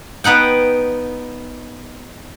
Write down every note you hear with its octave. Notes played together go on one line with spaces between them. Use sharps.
B3 D#4 F#5 G5